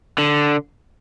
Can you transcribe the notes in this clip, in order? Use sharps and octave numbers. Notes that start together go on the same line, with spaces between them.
D3